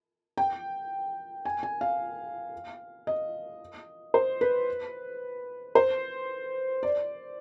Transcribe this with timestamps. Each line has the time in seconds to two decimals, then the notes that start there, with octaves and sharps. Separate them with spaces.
0.37 G5
1.45 G#5
1.63 G#5
1.81 F5
3.07 D#5
4.14 C5
4.41 B4
5.75 C5
6.83 D5